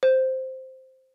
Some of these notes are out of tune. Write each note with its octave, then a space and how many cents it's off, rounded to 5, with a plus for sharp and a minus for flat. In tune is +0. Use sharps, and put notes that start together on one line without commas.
C5 +0